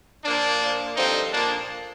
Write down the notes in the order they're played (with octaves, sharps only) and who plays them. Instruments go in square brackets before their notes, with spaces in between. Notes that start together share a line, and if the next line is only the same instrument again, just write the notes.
[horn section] A#2 F3 A#3 D4
A#2 F3
G2 D3 F3 C4 D#4
A#2 F3 A#3 D4